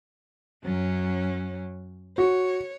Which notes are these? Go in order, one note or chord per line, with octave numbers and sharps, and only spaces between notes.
F#2 F#3 C#4
F#4 C#5